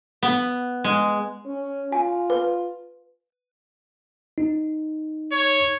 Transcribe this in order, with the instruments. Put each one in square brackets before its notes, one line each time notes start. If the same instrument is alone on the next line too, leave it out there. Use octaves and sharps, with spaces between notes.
[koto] B3
G#3
[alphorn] C#4
[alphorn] F4 [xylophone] G#5
[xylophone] B4
[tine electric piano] D#4
[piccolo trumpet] C#5